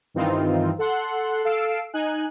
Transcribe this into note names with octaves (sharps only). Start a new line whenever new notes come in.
G2 D#3 E3 C4 D#4 F4
A4 F#5 C6 F#6
A4 F5 E6 C7 D7
D#4 G#5 F#6